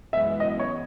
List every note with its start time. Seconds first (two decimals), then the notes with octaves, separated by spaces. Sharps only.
0.13 F#2 E3 G#3 B3 E5
0.40 D#5
0.59 C#5